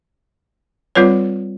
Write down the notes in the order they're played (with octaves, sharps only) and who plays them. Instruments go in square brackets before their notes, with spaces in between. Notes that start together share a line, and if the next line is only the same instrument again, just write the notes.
[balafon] G3 C4 F4 B4 C#5